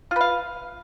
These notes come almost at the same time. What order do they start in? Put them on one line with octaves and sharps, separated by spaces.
F4 B4 F5